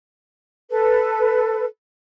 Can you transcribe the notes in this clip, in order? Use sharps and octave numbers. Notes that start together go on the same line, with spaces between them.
A4 B4